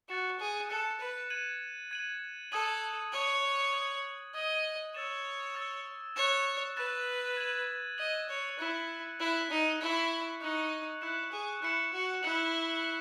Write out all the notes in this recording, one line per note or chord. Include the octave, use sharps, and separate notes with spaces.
F#4 F#6 A6 C#7 E7
G#4
A4 F#6 A6 C#7 E7
B4
G#6 D#7 F#7
G#6 D#7 F#7
A4 D#6 G#6 D#7 F#7
C#5 D#6 G#6 D#7 F#7
D#6 G#6 D#7 F#7
D#5 D#6 G#6 D#7 F#7
C#5 E6 A6 E7
E6 A6 E7
C#5 F#6 A6 E7
B4 F#6 A6 E7
G#6 D#7 F#7
D#5 G#6 D#7 F#7
C#5
E4 F#6 C#7 F#7
E4 F#6 C#7 F#7
D#4
E4 C#6 F#6 C#7 F#7
D#4 C#6 F#6 C#7 F#7
E4 F#6 C#7 E7
G#4
E4 F#6 C#7 E7
F#4
E4 F#6 C#7 F#7
C#7 F#7